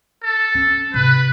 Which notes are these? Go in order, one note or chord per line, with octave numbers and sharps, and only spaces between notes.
A4
C#4
G#2 C3 B4